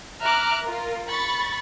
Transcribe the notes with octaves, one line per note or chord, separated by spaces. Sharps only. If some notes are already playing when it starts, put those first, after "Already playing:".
E5 A#5 D6 F6 F#6
F4 A#4
B5 C#6 A6